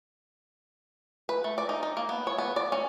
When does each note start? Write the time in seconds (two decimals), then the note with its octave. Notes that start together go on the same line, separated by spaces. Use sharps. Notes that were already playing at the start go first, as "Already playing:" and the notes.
1.29 B4
1.44 A3
1.58 D5
1.69 D#4
1.83 D#4
1.97 A#3
2.09 B3
2.27 C#5
2.38 B3
2.56 D5
2.72 C#4